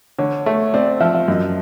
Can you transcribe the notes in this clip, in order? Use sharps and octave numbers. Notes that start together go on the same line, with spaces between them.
D3 C#5
A3 C#5
C4 D5
F3 E5
E5
F#2 D#5